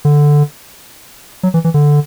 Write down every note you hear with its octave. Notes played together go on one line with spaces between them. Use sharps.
D3
F#3
E3
E3
D3